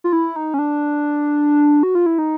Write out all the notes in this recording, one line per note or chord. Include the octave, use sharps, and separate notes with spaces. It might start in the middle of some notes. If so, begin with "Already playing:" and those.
F4
E4
D#4
C#4
D4
F#4
F4
E4
D#4